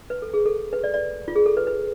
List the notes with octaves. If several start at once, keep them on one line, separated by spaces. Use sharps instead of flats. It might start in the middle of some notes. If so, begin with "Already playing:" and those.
B4
A4
G#4
A4
B4
D5
D5
F4
G#4
A4
B4
B4